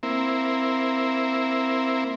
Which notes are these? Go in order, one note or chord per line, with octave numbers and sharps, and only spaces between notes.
A#3 C4 E4